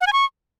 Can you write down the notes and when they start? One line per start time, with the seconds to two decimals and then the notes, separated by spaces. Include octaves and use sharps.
0.01 F#5
0.07 G#5
0.13 C#6